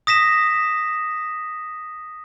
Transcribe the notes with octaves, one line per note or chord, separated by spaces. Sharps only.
D#6 A#6 B6 E7